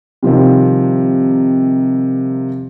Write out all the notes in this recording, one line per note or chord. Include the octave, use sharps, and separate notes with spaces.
C3 D#3 F3 G3